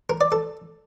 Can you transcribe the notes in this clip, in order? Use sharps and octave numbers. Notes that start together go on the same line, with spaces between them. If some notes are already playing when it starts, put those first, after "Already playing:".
A#4
D5
A4